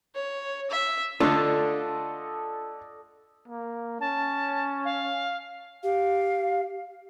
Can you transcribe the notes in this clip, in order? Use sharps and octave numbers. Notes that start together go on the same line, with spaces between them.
C#5
E5
D3 A3 D4 F4 A4 D5 D#5
A#3
C#4 A5
F5
G4 F5